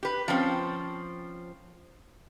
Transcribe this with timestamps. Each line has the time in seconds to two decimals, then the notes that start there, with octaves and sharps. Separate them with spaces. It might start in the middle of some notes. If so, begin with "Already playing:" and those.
0.03 G4 B4
0.28 F3 C4 C#4